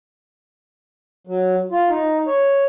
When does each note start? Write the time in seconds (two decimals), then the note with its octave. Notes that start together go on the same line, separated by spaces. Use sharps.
1.27 F#3
1.72 F4
1.89 D#4
2.27 C#5